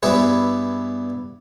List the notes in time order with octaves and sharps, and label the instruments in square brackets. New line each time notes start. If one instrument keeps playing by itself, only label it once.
[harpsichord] G2 B3 E4 G#4 B4